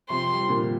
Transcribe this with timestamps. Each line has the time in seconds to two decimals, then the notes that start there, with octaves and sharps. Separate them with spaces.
0.10 C3 F3 C6
0.33 G3
0.41 F3
0.49 A#2 D3